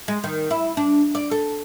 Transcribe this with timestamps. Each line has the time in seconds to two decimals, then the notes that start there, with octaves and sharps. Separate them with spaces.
0.08 G#3
0.24 D#3
0.51 E4
0.77 D4
1.15 D5
1.31 A4